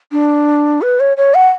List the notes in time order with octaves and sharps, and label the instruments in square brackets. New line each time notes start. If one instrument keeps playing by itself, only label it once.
[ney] D4
B4
C#5
C#5
F#5